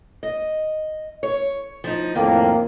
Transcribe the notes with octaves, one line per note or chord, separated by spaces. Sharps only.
D#5
C#5
F3 D#4
F2 A2 D#3 A#3